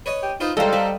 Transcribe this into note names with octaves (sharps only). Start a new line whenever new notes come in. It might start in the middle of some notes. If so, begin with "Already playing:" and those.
B4 C#5 D#5
G4
D#4 F4 B4 C5
C#2 G3 A4 C5 D#5 F5 A#5
C4 B4